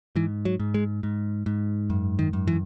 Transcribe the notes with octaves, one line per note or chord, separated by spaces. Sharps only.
G#2 E3
F#3
G#2
G#3
G#2
G#2
F#2
D#3
F#2
E3